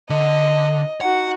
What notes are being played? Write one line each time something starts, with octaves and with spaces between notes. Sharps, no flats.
D3 D#5
D#4 F#4 F#5